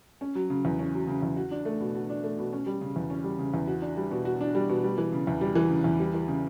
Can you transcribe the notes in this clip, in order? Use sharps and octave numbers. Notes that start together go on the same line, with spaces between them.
C#4
F#3
C#3
E2
C#4
F#3
C#3
E2
F#4
D4
A3
B2
F#4
D4
A3
B2
C#4
G3
C#3
E2
C#4
G3
C#3
E2
F#4
D4
G3
B2
F#4
D4
G3
B2
G3
E3
C#3
E2
G3
E3
C#3
E2
G3
E3
C#3